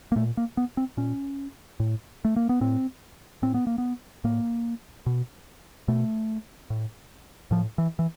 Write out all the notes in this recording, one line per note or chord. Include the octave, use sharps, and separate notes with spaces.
A#3
A#2 A3
A#3
B3
C4
A#2 C#4
A2
A3
A#3
B3
A2 C4
A2 C4
B3
A#3
B3
A2 A#3
B2
B2 A3
A2
A2 F3
E3
E3